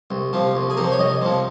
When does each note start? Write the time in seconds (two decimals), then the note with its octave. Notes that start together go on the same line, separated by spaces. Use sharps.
0.11 C2
0.33 C3 F3
0.55 C2
0.70 G#4
0.77 C3 F3 A#4
0.84 C5
0.92 C#5
0.99 C2 D#5
1.22 C3 F3